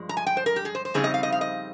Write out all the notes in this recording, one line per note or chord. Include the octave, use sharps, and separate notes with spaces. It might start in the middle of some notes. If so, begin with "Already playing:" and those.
Already playing: G2 F3 G#3
A#5
G#5
G5
C5
A#4
G4
G#4
C5
C5
F2 C#3 G3 C4 D#4 G#4
D#5
F5
D#5
F5
D#5